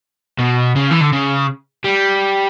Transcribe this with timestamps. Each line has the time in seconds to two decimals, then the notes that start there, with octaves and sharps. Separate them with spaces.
0.39 B2
0.76 C#3
0.91 E3
1.01 D3
1.12 C#3
1.84 G3